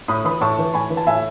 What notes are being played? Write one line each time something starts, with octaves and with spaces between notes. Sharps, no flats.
A2 B5 D#6
E3 B5 D#6
A2 A5 C#6
E3
A2 G#5 B5
E3
A5
A2 E5 G#5